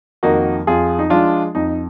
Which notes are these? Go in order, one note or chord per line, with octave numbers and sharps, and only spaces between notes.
F2 D#3 A#3 D#4 F#4
F2 F4 G#4
D#4
F3 G#3 D4 F4
F2 D#4